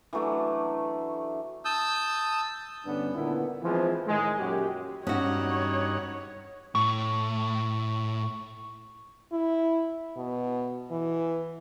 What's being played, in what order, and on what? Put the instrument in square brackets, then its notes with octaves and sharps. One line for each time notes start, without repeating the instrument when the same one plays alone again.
[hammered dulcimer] E3 F#3 A3 D4
[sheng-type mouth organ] A5 D#6 E6 G6
[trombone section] G2 D3 B3 C#4 D4
A#2 D3 D#3 B3 E4
E3 F3 G#3 C4 F4
A2 D#3 G#3
F#2 A#2 F#4 G4
[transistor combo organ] G2 D#4 F#5 [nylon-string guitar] C#4 F#4 [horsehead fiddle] C#5
[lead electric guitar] A2 [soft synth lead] C#6
[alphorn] E4
B2
E3